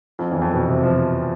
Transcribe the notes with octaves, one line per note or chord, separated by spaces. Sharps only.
F2
E2
F2
B2
C3
F3